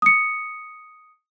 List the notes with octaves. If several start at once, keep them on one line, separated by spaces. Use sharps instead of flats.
D#6 C#7